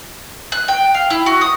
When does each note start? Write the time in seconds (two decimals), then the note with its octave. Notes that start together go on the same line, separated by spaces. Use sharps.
0.52 F#6
0.68 G5
0.94 F5
1.10 E4
1.26 F#4
1.41 D#6